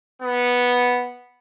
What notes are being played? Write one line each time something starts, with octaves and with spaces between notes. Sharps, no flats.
B3